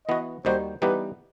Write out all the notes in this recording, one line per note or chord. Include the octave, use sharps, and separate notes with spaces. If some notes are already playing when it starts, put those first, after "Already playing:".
E3 B3 F#4 D#5
D#2 D#3 G3 D#4 F#4 C5
E3 G3 B3 D#4 G4 B4